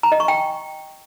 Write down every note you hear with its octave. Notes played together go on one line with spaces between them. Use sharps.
A#5
D#5
C#6
G5